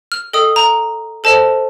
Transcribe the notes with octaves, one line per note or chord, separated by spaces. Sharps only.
F6
A4 D#5 G5 D#6
A#5
A4 C5 D#5 A5